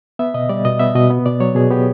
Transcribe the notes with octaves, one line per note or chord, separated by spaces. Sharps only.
B3 E5
B2 D#5
G3 D5
B2 D#5
B3 E5
B2 D#5
B3
B2 D5
F#3 C#5
B2 G#4
B3 G4